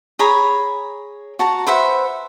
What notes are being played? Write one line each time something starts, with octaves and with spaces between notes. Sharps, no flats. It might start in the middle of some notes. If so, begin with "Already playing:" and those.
G#4 C#5 A#5 B5
F#4 A5 A#5
B4 C5 E5 F#5